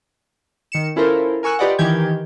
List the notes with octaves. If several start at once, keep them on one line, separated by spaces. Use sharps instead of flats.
D#3 C#7 E7
C#4 E4 F4 A4 A#4 C5
A#4 G#5 C#6 E6 F#6
F4 G4 B4 D5 D#5 F#5
D#3 E3 G4 G6 G#6